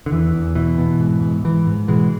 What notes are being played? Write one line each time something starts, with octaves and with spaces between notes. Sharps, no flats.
D3
E2 E3
E2
B2 E3
B2
G#2
G#2
G#2 E3
G#2
B2 E3 G#3